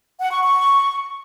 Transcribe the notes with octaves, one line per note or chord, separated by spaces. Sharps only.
F#5
C#6
C#6